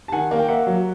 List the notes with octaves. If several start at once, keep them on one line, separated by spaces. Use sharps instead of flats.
A5
D#3 F#5 G#5
A#3
G5
A#3 E5 F#5
F#3